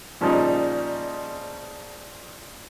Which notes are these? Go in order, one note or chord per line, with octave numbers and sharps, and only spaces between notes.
A#2 C#3 F3 G3 D#4